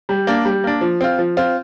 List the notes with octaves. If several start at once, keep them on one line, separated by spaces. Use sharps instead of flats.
G3
A#3 D4
G3
A#3 D4
F3
C4 F4
F3
C4 F4